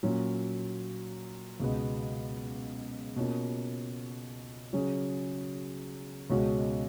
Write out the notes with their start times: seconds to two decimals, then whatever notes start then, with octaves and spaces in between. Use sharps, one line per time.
0.03 A#2 F#3 C#4
1.60 C#2 B2 G#3 B3
3.16 B2 A#3 C#4 F4
4.73 C#3 F#3 C#4 G#4
6.30 C#2 B2 G#3 C#4 F#4